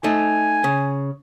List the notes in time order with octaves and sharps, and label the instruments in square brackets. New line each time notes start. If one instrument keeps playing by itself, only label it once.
[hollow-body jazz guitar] A3 D#4 [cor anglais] G#5
[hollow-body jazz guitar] C#3